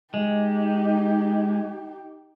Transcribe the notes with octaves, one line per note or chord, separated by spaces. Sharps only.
G#3 D#4 G4